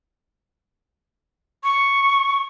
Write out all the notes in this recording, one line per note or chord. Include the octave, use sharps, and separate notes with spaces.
C#6